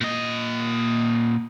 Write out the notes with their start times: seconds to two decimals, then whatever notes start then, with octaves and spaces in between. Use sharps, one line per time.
0.01 A#2 D#5